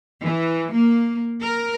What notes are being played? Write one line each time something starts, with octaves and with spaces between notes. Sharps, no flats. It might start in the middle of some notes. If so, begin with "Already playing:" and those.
E3
A#3
A#4